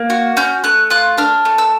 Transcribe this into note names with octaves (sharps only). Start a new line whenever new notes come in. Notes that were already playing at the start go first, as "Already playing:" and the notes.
Already playing: A#3
F#4
C#4 G6
A3 F#6
F4 F#6
D4 F6
A3
E6